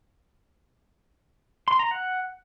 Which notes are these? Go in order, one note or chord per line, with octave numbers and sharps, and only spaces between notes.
C6
A#5
F#5